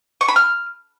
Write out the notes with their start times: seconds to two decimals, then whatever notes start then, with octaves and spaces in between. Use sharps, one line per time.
0.21 C#6
0.28 B5
0.36 F6